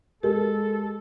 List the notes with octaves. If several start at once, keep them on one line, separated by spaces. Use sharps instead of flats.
G#3 G4 A4 A#4